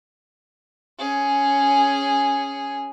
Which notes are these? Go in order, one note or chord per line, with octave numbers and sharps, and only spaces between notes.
C#4 G#4